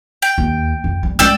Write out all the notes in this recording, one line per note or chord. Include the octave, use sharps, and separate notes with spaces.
G5
D#2
F2
G3
G#3 C#4 D5 G5 E6